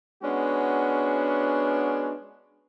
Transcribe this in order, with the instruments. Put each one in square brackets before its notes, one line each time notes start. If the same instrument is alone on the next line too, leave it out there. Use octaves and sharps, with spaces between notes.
[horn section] G#3 B3 C#4 D4 F#4